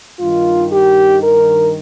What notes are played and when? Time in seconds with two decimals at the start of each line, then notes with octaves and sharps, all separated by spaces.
0.19 G2 D#3 F4
0.71 G4
1.23 A#4